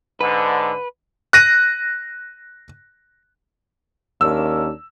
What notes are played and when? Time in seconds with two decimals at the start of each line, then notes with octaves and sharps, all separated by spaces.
0.21 G#2 D3 B4
1.33 F#6 A#6 D#7
4.21 D#2 C#4 D4 A#4 E6